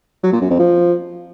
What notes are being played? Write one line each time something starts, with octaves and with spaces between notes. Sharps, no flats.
F#3
A#2
F#2
F2
F3